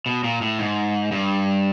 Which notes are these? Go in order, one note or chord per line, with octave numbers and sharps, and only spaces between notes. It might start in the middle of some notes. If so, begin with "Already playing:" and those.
B2
A#2
A2
G#2
G2